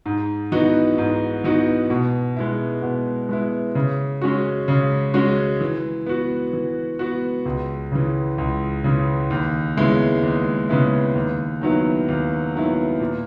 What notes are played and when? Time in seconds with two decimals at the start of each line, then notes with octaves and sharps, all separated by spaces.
0.06 G#2
0.52 E3 B3 D#4 F#4
0.98 G#2
1.44 E3 B3 D#4 F#4
1.90 B2
2.37 G#3 B3 E4
2.82 B2
3.29 G#3 B3 E4
3.75 C#3
4.22 G#3 C#4 F#4
4.68 C#3
5.14 G#3 C#4 F#4
5.61 E3
6.07 B3 F#4
6.53 E3
6.99 B3 F#4
7.45 C#2
7.92 C#3 E3
8.38 C#2
8.84 C#3 E3
9.30 D#2
9.77 C#3 G#3 B3 E4
10.23 D#2
10.69 C#3 G#3 B3 E4
11.15 D#2
11.61 D#3 F#3 B3 E4
12.08 D#2
12.54 D#3 F#3 B3 E4
13.00 A#2